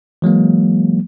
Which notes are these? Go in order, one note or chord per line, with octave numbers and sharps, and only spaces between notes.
E3 F#3 G#3 A#3